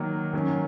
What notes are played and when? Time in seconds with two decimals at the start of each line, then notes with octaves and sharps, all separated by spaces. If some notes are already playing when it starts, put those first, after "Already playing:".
Already playing: D#3 F#3 A#3
0.33 D#3 F#3 C#4